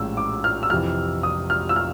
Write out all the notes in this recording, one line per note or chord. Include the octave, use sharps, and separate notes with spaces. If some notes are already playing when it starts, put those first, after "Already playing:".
Already playing: A#1 A2 E3 G#3 C#4 E6
D6
F6
E6
F2 C3 E3 F6
D#6
F6
E6
F6